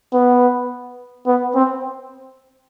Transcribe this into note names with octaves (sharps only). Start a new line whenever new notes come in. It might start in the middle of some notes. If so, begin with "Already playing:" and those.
B3
B3
C4